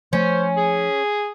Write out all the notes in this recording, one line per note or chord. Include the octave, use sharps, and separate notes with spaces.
F3 A3 C#4 C5
G#4